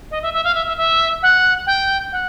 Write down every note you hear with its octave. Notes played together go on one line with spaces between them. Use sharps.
D#5
E5
E5
F5
E5
E5
E5
F#5
G5
F#5